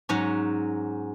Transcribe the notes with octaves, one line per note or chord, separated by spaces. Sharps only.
G#2 F#3 C#4